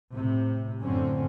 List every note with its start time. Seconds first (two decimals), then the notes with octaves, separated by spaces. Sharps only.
0.12 A2 C3
0.82 F#2 A2 D3 C4 C#4